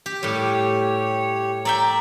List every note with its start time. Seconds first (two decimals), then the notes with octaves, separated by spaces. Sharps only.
0.06 G4
0.23 A2 G3 G4 C#5
1.65 D5 E5 G5 A#5